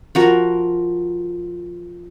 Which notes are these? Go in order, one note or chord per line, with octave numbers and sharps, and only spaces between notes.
F3 F#4 A#4